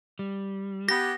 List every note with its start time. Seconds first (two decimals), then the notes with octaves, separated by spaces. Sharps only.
0.19 G3
0.89 B3 G4 A#6